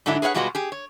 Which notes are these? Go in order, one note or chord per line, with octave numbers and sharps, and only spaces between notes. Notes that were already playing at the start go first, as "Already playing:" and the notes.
G#2 D3 F#3 D4 E4
G#4 B4 C#5 F5 F#5
B2 G3 G#3 F4 F#4 B4
G4 G#4
C#5